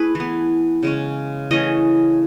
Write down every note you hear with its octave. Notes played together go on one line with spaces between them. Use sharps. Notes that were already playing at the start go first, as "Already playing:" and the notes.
Already playing: A3 E4 G#4 B4
E3 B3
C#3 G#3 C#4
E3 A3 C#4 D#5